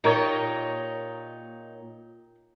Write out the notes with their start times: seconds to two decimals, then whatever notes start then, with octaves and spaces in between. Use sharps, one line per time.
0.04 A#2 D#4 G4 A#4 C#5